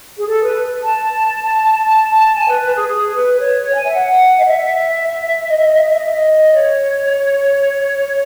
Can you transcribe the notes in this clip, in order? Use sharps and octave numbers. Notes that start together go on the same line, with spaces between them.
G#4
A4
B4
A5
A5
A5
G#5
B4
B4
G#4
G#4
B4
C#5
C#5
G#5
E5
F#5
D#5
E5
D#5
E5
D#5
E5
D#5
E5
D#5
E5
D#5
C#5